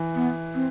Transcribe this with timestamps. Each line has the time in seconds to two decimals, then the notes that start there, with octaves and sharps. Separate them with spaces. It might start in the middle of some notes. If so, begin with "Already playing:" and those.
Already playing: E3
0.15 B3
0.55 C4